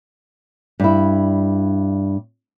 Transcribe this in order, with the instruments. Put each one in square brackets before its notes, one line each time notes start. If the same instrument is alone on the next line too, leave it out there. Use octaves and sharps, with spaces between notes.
[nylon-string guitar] G2 E4